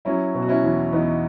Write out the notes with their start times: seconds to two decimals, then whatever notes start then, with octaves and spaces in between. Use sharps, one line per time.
0.05 F#3 C#4 E4
0.35 B2
0.42 F#4
0.49 C#4 E4
0.63 E2
0.92 E2 B3 D#4